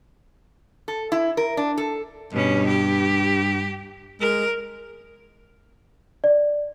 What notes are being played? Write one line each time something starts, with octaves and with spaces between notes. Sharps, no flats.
A4
E4
A#4
D4
A4
G2 B2 C#4
G4
G#3 A#4
D5